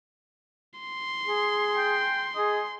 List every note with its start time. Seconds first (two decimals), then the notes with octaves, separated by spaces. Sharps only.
0.80 C6
1.27 G#4
1.76 G5
2.35 G#4 D#5